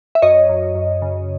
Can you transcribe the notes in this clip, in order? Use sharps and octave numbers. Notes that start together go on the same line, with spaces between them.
E5
F#2 C#5 D#5
F#2
F#2
C#3